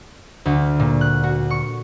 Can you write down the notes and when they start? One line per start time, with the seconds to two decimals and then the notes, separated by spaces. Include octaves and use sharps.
0.46 D2
0.80 A#2
1.01 F#6
1.23 F#4
1.50 C#6